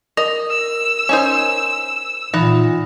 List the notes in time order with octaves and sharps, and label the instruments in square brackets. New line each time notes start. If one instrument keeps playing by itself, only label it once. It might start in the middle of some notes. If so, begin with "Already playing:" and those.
[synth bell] A#4 [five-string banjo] D#5
[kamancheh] E6
[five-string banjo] C#4 D#4 C5
[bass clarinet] A#2 [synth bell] E3 D#4 [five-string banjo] F#5